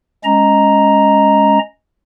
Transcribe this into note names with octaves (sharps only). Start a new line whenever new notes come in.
G#3 C#4 D#5 A#5